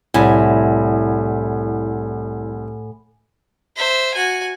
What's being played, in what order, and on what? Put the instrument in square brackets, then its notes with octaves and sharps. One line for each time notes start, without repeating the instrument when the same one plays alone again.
[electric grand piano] C2 [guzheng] A2 [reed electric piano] E4 D5 [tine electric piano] F#5 G#5 B5
[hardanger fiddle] C5 E5
F#4 G#5